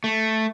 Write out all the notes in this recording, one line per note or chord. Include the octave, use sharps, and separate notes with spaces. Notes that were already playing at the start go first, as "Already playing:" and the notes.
A3